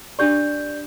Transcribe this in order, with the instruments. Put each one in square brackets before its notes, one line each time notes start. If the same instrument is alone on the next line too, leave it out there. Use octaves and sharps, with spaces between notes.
[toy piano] D4 G4 C#6 [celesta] D5 G6